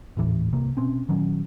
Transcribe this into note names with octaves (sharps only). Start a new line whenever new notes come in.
G#1 D#2 A2 E3
C2 C3 A#3
B2 C4 C#4
A#2 D#3 F#3 C#4